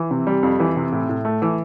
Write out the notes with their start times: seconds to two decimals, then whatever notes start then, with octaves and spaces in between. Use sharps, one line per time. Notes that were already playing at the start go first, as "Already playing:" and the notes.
Already playing: E3
0.11 C3
0.27 G3
0.43 F2
0.60 E3
0.76 C3
0.92 A2
1.09 A2
1.25 A3
1.42 E3